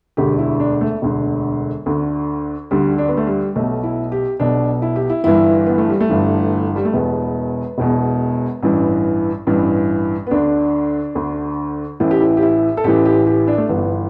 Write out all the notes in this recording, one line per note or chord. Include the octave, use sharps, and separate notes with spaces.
E1 D2 D3 G4
E4
D4
A3
E1 D2 D3
D2 D3
D2 D3 G3
D4
B3
A3
G3
B1 B2 A3
E4
G4
B1 B2 D4
E4
G4
E4
G1 G2 E3 E4
B3
A3
G3
A3
G1 G2 E3
G3
A3
E1 E2 B2 B3
E1 E2 B2
A1 G2 E3
A1 G2 E3
B3
D2 D3 D4
D2 D3
A1 A2 E3 E4
G4
E4
G4
E4
A4
A1 A2 E3 G4
G4
G4
D4
A3
G1 G2 E3 B3